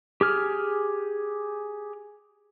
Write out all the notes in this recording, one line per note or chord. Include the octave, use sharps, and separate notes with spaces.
G4 G#4 F6